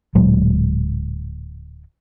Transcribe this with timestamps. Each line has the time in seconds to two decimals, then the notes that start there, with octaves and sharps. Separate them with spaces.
0.15 D1 A#2 F#3 G#3